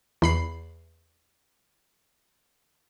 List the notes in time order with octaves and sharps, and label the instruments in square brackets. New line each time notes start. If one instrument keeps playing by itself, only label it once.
[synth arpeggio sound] E2 B5 C7